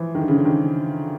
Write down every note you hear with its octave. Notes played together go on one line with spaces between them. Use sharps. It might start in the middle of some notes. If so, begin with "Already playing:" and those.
Already playing: E3 F3
D#3
D3
C#3
D3
D#3